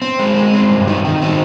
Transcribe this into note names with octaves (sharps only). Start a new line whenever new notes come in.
C4
G#3
G#3
C4
G2
D#3
D#3
C4